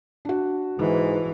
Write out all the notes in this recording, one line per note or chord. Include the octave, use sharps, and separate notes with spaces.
D4 F#4
G#2 E3